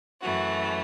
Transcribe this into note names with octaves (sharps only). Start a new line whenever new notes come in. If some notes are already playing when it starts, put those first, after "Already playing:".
F#2 E3 A3 F#4